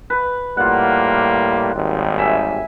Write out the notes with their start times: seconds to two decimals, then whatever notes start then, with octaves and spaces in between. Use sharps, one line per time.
0.10 B4
0.57 A2 G3 A#3 F4 F#5
1.75 G#1 D#2 G3
2.19 E5 G#5